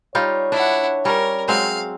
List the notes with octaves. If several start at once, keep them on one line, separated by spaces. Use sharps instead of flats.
G3 D#4 F4 C#5
D4 E4 F#5
G3 C#4 A#4
F#3 G#3 C4 F5